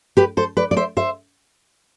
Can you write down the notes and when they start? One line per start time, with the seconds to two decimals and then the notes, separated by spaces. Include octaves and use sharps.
0.17 G4 B4
0.37 A4 C5
0.57 B4 D5
0.71 D5
0.77 C5 E5
0.97 C5 E5